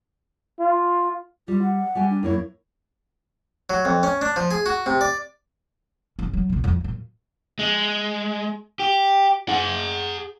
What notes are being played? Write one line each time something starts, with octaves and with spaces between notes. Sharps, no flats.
F4
G3 F4
F#5
G3 G4 G#5
D4
F#2 A#3 E4 C#5
F#3
F2
C#4
D4
F3
G#4
F#4
C3
D5
G2 C#4
F#3
C2 B2
F2
F#2 A#2
G#3
G4
G#4 F#5